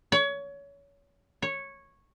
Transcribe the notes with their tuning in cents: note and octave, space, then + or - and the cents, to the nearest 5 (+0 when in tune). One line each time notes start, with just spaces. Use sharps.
C#5 +25
C#5 -10